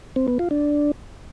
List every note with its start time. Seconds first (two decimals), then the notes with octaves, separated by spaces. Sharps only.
0.16 C4
0.28 B3
0.39 F4
0.51 D4